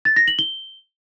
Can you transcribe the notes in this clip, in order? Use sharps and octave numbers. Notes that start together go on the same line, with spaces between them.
A6
A#6
F#7
G7